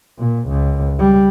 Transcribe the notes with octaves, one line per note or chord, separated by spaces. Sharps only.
A#2
C#2
G3